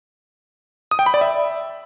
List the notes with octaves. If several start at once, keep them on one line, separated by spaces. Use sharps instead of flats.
D#6
G5
B5
D5
E5